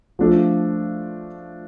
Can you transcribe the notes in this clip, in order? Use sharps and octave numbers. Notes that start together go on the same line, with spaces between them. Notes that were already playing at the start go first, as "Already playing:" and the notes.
F3 A3 D4 F4 A4